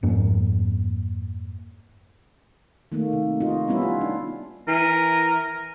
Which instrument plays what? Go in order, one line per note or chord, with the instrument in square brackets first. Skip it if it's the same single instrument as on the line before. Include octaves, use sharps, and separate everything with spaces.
[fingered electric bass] F2 G#2 A#3 C#4
[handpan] D#3 A3 A#3
C3
D#4 F4 F#4
G3 B3 C#4 E4
F4
D4
[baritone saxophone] E3 [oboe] A#4